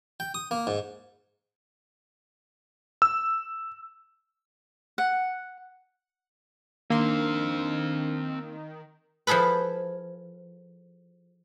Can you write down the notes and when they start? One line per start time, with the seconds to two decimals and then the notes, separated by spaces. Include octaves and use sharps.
0.20 G5
0.34 D#6
0.51 A#3
0.67 G#2
3.02 E6
4.98 F#5
6.90 D#3 A#3 C4 D4 D#4 F5 C6
9.27 F3 E4 G#4 A4 B4